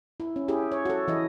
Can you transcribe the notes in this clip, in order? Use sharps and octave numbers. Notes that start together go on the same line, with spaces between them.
E4
C#4
E4 G4 G#4
C#5
F#4 A4
E3 E4 D#5